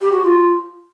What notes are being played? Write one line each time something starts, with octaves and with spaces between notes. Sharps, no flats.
G4
F#4
F4